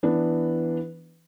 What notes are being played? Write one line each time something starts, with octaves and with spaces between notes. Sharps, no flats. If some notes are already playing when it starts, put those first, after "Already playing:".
E3 B3 D4